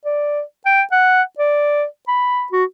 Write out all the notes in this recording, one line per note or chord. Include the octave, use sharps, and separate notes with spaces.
D5
G5
F#5
D5
B5
F#4